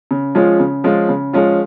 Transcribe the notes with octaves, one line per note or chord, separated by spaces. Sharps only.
C#3
F3 G#3 C#4 F4
C#3
F3 G#3 C#4 F4
C#3
F3 G#3 C#4 F4